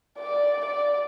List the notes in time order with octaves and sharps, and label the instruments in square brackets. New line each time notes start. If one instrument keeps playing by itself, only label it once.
[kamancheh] D5
D5